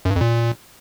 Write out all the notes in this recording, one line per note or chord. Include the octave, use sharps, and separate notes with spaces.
F#2
G2
F2
A#2